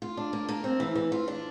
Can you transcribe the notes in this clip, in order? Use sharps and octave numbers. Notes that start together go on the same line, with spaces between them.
F4
D4
A#3
A#3
C4
E3
E3
F4
D4